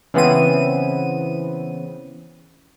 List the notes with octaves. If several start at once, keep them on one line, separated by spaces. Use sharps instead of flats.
C#3 E3 B3 C4 D#7